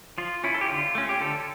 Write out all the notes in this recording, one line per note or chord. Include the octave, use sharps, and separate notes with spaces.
F3 F4
C#4 E4
A4
G4
D3 F4
A3 C#4
G4
D3 A4